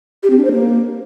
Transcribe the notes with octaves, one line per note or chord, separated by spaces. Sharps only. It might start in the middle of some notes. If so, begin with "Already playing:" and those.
G4
C4
D4
C5
A#3